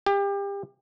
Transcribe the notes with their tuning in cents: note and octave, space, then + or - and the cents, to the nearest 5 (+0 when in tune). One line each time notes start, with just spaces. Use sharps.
G4 +30